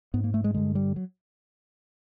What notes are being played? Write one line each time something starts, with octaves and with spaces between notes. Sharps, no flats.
G#2 B3
A#3
A3
G#3
G2 D3 G#3
G3
F#3